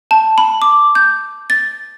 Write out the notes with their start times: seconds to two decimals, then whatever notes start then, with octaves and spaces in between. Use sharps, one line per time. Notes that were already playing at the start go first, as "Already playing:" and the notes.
0.11 A5
0.38 B5
0.62 D6
0.95 G6
1.50 A6